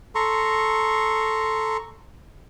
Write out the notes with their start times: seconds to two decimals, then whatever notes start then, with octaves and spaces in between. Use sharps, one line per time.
0.15 A4 A#5 C6 C#6